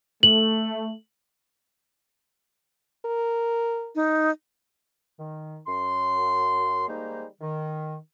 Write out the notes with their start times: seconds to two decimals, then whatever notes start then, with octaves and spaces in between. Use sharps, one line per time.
0.23 A3 F#7
3.05 A#4
3.95 D#4
5.19 D#3
5.67 F#2 C6
6.88 D#3 G3 G#3 A#3 D#4 C5
7.41 D#3